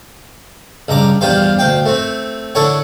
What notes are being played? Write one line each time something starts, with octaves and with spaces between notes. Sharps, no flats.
C#2 G2 A#5 D6
E2 G2 F4 G4 C5 F5
D2 F5 G5
A3 C4
D3 E4 A4 C#5 F#5